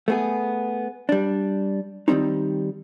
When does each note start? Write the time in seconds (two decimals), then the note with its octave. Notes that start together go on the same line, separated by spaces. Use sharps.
0.08 A3 B3 G#4
1.09 G3 D4
2.08 D#3 F#3 G3 C4 D#4